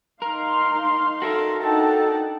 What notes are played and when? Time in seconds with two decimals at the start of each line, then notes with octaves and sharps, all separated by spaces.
0.22 D#4 A#4 F5 C6
1.22 F#4 A4 A#4 E5
1.63 D4 D#4 A4 F#5 G5 A5